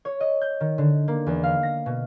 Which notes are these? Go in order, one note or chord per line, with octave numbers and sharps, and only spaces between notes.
C#5
D#5
G6
D#3
D3
A#3
E2
F5
A#6
B2